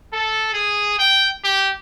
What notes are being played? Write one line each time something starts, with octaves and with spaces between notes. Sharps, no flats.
A4
G#4
G5
G4